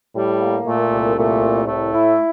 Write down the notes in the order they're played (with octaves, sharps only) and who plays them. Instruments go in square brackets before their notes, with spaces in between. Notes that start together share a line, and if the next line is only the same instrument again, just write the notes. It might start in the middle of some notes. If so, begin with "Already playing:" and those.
[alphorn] A2 [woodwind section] G3
[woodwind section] A#3
[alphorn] A#2 [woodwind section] A3
[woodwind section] C2
[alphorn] A#2 [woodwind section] A3
[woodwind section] C2
[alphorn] A2 [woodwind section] A3
[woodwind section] E4